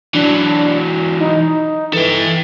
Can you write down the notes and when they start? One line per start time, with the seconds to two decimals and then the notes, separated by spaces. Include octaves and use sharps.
0.14 E3 F#3 D4
1.20 D#4
1.93 E3 A4 G5